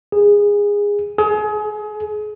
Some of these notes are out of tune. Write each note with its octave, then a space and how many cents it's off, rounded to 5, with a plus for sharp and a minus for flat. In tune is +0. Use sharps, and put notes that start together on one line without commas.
G#4 -20
G#4 +30